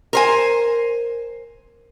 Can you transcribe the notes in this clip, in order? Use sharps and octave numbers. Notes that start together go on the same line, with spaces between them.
A#4 C5 G#5